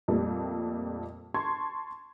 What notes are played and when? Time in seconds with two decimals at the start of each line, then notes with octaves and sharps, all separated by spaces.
0.08 F2 A#2 G3 A3
1.34 A5 C6 C#6 G#6